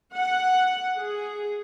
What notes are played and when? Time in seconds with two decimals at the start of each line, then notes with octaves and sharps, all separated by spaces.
0.16 F#5
0.98 G#4